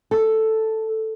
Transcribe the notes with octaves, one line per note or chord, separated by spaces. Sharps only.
A4